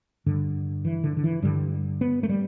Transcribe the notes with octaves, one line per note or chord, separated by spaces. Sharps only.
G2 D3
E3
D3
D3
E3
G2 D3 G3
B3
A3
G3